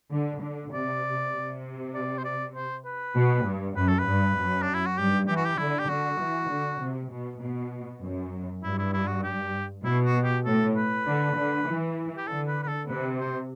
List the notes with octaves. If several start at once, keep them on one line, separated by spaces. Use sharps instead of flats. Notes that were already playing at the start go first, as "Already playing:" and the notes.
D3
D3
C3 D5
C3
D5
C5
D5
C5
B4
B2
G2
F#2 B4
A4
B4
G2
F#2
D4
E4
F#4
G2 G4
E3 G4
F#4
G4
D3 E4
G4
D3 F#4
E3
D3
C3
B2
B2
F#2
G2 E4
E4
E4
F#4
G4
B2 E4
F#4
G4
A2 A4
B4
D3
D3
E3
G4
D3 A4
B4
B4
A4
C3 B4
C5